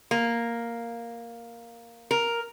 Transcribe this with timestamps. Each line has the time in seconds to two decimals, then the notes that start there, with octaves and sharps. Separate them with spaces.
0.11 A#3
2.11 A#4